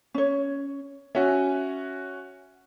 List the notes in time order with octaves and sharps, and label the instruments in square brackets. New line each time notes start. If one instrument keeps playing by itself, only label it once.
[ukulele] C#4 C#5
[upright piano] C#4 F#4 [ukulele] E5 G#5